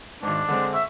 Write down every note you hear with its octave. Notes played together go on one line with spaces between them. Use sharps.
G#1 G#2 D4
D3 G#3 C4
E5 C#6